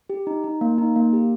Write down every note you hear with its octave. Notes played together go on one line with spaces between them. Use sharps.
G4
D#4
D#4
A#3
D#4
A#3
G4